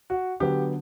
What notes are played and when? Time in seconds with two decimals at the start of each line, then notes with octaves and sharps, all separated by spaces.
0.10 F#4
0.40 D3 F#3 B3 G4